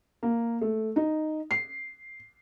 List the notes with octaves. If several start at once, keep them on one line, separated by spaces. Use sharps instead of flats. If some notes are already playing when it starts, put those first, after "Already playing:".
A#3
A3
D#4
C7